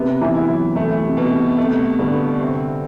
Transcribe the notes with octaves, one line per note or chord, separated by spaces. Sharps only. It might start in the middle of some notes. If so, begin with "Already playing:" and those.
Already playing: C3 B3
E3
E4
F#3
E3 A3
C3
B2
C3
C3 A3
G2 D3
C3 C4